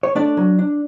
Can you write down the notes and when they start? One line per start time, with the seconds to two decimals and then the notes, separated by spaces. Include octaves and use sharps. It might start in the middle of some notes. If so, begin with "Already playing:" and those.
0.03 C#5
0.15 A3 D4 D5
0.37 F#3
0.59 D4